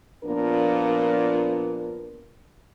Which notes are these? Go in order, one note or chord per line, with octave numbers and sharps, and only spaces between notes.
A#2 F3 A#3 B3 D4 A#4